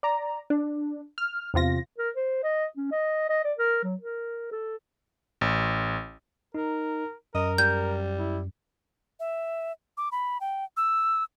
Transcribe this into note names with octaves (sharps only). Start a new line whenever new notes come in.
D5 A#5
D4
F6
E2 C3 F4 A#6
A#4
C5
D#5
C#4
D#5
D#5
D5
A#4
F#3
A#4
A4
A1
D#4 A#4
F#2 A#4 D#5
G3 G6
E4
E5
D6
B5
G5
E6